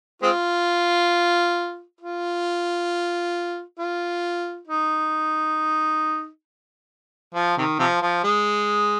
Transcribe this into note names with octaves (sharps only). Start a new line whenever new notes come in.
G#3 C4 F4
F4
F4
D#4
F3
C3 D#3
C3 F3
F3
G#3